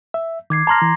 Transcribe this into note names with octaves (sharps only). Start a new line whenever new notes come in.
E5
D#3 D6 G#6 C7
A5 A#5 C6 F6 A#6
E3